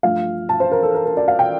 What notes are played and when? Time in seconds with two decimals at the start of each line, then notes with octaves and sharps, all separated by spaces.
0.03 G2 F3 A3 F5
0.49 A5
0.60 C5
0.72 A#4
0.83 A4
0.94 A#4
1.06 A#4
1.17 D5
1.28 F5
1.39 G5